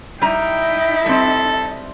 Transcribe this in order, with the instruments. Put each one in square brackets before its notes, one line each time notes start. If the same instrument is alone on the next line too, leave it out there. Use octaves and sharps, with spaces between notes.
[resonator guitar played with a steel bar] G3 A#5 [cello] D#4 E4 [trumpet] G5
[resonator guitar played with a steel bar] G3 C4 [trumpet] A4